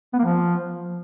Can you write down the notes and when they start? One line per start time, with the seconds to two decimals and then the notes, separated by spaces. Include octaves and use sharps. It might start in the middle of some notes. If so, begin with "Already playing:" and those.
0.14 B3
0.19 A#3
0.24 F3